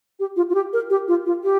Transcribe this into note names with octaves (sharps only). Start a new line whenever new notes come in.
G4
F4
F4
G4
A#4
G4
F4
F4
G4